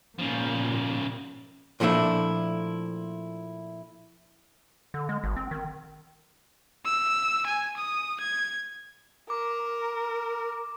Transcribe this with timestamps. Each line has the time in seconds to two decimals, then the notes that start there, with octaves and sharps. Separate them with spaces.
0.19 A#2 C#3 F3
1.80 A#2 F3 A3 D4 E4
4.94 D3
5.09 G#3
5.24 G#1
5.37 C4
5.51 D#3
6.85 E6
7.46 G#5
7.77 D#6
8.20 G#6
9.30 A#4 D6